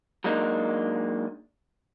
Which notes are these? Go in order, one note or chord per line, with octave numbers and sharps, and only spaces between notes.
F#3 G#3 A#3 D4 D#4